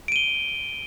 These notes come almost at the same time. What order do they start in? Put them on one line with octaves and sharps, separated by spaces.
D7 D#7 G7